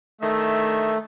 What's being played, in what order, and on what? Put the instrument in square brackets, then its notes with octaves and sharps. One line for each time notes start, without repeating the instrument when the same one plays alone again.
[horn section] D#3 D4 E5 [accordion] A3